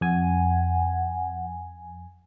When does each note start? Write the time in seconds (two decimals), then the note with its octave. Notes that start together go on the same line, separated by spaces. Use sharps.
0.01 F2 F#5 G#5